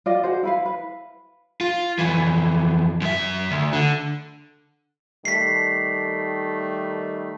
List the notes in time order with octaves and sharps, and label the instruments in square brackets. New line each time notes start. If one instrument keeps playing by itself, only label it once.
[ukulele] F4 D5 D#5
F#4 G#4 C5
E4 B4 F5
B4
[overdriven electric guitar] F4
F2 E3
F#2 E5
D2
D3
[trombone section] D#3 G3 A3 [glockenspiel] B6 C7